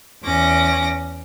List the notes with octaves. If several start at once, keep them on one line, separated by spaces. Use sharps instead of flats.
E2 C#4 D6 A#6